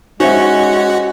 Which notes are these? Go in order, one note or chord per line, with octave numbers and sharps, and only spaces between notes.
G#3 C#4 D#4 F#4 C5 E5